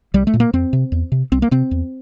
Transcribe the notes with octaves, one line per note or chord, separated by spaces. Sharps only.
C2 G3
A3
A#2
A#3
F2 C4
C3
E2
C3
C2 C4
A#3
C3 C4
E2